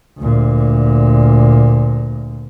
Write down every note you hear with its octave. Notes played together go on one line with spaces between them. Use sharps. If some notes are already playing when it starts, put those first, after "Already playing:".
D2 A#2